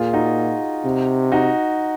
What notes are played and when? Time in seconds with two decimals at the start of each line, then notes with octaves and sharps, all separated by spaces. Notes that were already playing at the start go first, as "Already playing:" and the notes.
Already playing: A#2 F4 G#4
0.13 D#4 F#4
0.85 C3
1.32 D#4 F#4